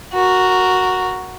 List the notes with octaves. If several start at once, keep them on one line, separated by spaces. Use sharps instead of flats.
F#4 A#4